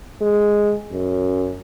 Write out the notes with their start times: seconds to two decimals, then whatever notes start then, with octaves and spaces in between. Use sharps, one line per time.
0.21 G#3
0.92 F#2